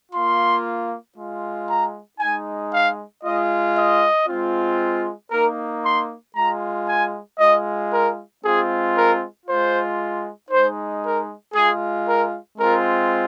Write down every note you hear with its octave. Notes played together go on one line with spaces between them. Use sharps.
A#3 F4 C6
G#3 F4
A#5
G#3 D#4 G#5
F5
G#3 F4 D#5
D#5
G#3 C4 F4
A#3 D#4 A#4
C6
G#3 F4 A#5
G#5
G#3 F4 D#5
A#4
G#3 C4 F4 G#4
A#4
G#3 F4 C5
G#3 D#4 C5
A#4
G#3 F4 G#4
A#4
G#3 C4 F4 A#4